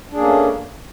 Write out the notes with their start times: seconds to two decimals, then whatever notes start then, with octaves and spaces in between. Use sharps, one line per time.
0.12 D4
0.15 G#4
0.18 A#3
0.20 C#4
0.23 A3